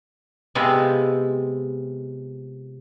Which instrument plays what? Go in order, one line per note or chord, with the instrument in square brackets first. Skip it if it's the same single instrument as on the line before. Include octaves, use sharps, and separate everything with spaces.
[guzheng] C3 G#3 B3 F4